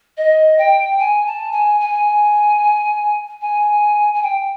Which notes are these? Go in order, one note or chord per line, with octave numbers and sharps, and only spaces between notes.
D#5
G5
G#5
A5
G#5
G#5
G#5
G#5
G5